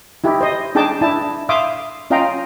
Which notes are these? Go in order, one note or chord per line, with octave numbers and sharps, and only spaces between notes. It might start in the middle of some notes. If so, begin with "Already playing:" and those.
D#4 E4 G4
C5 D#5
D4 D#4 G#4 G5 A5 D6
D4 E4 A5
E5 F5 C6 D6 D#6
C#4 F4 D#5 F5 G5 A#5